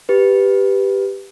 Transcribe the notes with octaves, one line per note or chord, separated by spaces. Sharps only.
G4 B4